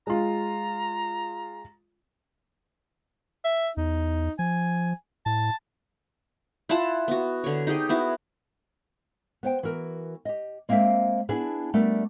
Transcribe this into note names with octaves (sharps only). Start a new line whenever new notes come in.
G#3 F4 A#5
E5
E2 D#4
F3 G#5
A2 A5
E4 F4 F#5 A5
B3 F#4
D3 C#5
D#4 G4 G#4 D#5
B3 E4 F#4
B3 C5 G5
E3 F#4 A#4
G4 D#5
G#3 A#3 C4 C#5 E5 F5
B3 D4 E4 G#4 B4 A5
G3 A3 B3 D4 G4 A#4